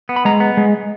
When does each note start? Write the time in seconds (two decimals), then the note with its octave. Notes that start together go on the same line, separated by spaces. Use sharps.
0.09 B3
0.16 B5
0.25 G#3 A#5
0.40 B3
0.57 G#3